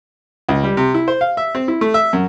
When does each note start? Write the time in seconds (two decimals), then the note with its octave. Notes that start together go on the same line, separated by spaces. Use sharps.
0.49 C#2
0.64 G3
0.77 C3
0.94 E4
1.08 C5
1.21 F5
1.37 E5
1.55 C4
1.68 E4
1.81 A3
1.94 E5
2.13 F#2